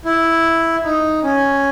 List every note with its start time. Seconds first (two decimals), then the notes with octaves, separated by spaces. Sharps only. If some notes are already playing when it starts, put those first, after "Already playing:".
0.05 E4
0.84 D#4
1.23 C#4